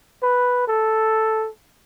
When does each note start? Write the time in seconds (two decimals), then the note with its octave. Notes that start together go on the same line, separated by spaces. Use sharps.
0.23 B4
0.68 A4